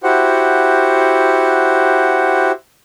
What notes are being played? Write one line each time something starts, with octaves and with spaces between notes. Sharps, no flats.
E4 F#4 G4 C5 F#5